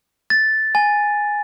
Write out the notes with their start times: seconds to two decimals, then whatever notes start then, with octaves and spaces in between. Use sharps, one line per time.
0.30 A6
0.75 G#5